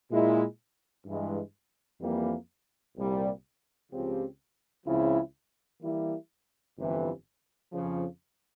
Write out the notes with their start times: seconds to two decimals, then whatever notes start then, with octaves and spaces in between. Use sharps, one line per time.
0.10 A#2 G#3 E4
1.05 G2 E3 G#3
2.01 F2 E3 G3 A#3
2.97 C2 A#2 G3
3.92 C#2 C#3 F3 C4 G4
4.86 C#2 C#3 F3 C4 E4
5.82 E3 G3 A#3 E4
6.77 G1 F2 C3 E3
7.72 F2 C#3 F3